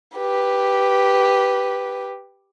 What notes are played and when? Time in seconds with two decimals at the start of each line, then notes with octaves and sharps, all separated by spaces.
0.17 G4 B4